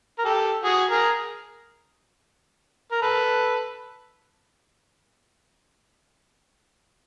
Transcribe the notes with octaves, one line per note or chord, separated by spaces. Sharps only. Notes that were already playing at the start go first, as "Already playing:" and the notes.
A#4
G4 A4
F#4 G#4
G#4 A#4
A#4
A4 B4